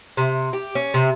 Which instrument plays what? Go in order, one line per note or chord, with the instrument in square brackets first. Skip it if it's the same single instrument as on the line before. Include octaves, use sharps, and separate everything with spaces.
[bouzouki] C3
G4
C#4
C3